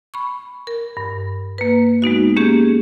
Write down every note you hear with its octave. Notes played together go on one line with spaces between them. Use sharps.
B5 C#6
A#4
G2
A#3 B4
G#3 B3 D#4 F#4
A#3 C#4 G4 G#4